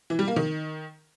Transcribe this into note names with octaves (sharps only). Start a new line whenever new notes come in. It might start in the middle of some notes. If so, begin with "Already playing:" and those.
E3
G3
A#3
D#3